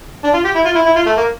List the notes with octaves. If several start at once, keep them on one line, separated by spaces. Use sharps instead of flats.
D4
F4
G4
E4
F4
E4
E4
F4
A3
A#3